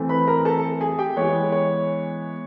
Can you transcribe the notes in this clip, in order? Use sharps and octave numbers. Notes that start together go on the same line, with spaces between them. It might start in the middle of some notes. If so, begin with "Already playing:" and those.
Already playing: E3 A3 C4
B4 B5
A#4 A#5
A4 A5
G#4 G#5
G4 G5
E3 G#3 B3 C#5
C#5